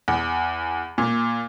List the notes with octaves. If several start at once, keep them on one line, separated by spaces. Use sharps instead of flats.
E2
A#2